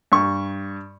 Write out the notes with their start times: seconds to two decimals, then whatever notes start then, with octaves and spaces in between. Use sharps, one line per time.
0.12 G2 C#6